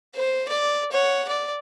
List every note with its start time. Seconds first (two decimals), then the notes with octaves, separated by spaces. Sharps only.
0.15 C5
0.49 D5
0.92 C#5 F#5
1.29 D5